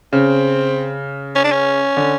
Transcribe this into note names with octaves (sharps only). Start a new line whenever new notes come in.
C#3 C4
C#4
D4
C#4
D3